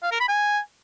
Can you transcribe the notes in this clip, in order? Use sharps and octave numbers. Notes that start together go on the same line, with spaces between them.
F5
A#4
B5
G#5